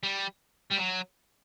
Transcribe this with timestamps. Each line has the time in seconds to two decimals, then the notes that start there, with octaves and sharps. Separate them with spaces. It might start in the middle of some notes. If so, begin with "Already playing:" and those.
0.03 G3
0.71 G3
0.77 F#3